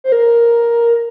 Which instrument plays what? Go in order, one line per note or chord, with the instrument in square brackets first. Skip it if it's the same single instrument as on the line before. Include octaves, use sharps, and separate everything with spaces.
[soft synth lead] C5
A#4